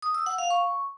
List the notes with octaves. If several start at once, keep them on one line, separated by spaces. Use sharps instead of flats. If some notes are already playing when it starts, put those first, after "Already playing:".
D#6
E6
F#5
F5
C#6